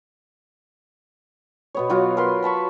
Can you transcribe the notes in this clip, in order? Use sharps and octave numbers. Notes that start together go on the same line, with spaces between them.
B2 B3 C#5
F#3 F4 F#4
A#4 B4 C6
B4 A5 B5 C#6